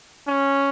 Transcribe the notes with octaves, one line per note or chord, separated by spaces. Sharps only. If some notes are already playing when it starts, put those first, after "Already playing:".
C#4